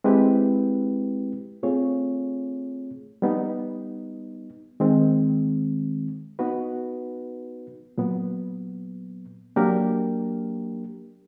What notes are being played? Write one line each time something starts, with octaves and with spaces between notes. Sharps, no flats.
G#3 C4 E4 G4 B4
A3 C4 F4 G#4 C#5
G3 B3 D#4
D#3 G#3 C4
B3 D#4 F#4 B4
A#2 F#3 B3
F#3 A#3 D4 G4 A#4